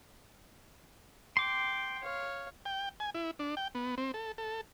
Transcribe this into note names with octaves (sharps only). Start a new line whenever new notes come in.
G5 C6 D6
C#5 F5
G5
G#5
E4
D4
G5
B3
C4
A4
A4